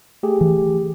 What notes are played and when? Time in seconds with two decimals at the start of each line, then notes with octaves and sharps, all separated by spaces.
0.23 A3 G4 G#4
0.41 E3